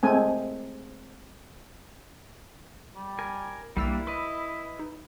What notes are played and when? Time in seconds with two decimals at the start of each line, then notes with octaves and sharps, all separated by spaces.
0.03 G#3 A3 C4 G#5
2.96 G3
3.19 A#4 G#5
3.77 B1 G3 A#3 D4 E4 E6 A6
4.07 B4 D#5 B5
4.79 D#4